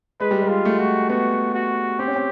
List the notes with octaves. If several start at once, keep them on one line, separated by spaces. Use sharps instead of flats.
G#3 B4
G3
G#3
F4
A3
F#4
B3 F#4
F#4
C4 G4
C#4
C4